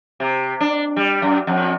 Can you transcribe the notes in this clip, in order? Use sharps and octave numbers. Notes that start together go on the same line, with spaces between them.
C3
D4
G3
F#2
F2